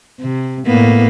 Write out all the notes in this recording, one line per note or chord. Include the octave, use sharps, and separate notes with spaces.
C3
A2 A#3 B3